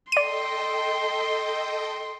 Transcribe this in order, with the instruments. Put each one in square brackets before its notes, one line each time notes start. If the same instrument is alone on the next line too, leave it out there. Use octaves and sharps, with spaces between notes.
[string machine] A4 D#5 G5 [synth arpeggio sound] D5 D#7 [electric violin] C6